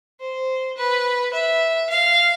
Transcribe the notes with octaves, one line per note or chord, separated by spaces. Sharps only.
C5
B4
E5
F5